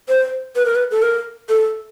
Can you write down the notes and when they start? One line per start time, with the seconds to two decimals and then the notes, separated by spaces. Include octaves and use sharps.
0.09 C5
0.56 B4
0.66 A#4
0.75 B4
0.91 A4
1.02 A#4
1.49 A4